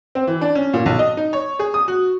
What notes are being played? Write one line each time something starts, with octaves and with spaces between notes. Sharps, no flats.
C4
E3
D4
C#4
A#2
B1
D#5
D#4
C#5
G#4
D#6
F#4